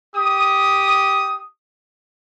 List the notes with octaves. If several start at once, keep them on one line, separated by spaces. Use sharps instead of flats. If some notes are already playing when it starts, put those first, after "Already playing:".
G4 D#6